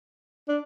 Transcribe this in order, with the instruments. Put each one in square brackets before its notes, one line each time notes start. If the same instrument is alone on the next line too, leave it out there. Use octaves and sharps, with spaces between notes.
[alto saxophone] D4